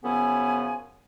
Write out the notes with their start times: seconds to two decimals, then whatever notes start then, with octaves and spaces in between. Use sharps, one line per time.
0.04 F#2 C#3 F3 B3 E4 G#5